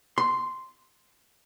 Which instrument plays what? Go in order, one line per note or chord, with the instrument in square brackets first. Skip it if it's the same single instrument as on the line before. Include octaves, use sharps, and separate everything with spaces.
[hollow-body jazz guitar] C6